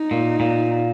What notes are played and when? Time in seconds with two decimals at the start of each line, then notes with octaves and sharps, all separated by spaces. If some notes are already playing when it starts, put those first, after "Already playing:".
Already playing: D#4
0.11 A#2
0.40 A#2